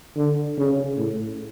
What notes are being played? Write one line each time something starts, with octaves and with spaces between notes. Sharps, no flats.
D3
C#3
A2